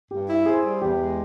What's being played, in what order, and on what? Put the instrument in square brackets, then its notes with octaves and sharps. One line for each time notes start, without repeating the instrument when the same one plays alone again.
[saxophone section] G2 [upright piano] G4
[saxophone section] E4
[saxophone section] C4 [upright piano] G#4
[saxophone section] G3
[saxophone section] E2 [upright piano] G4
[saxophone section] G#3